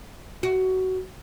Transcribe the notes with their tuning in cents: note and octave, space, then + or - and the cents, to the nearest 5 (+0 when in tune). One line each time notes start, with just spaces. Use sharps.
F#4 +20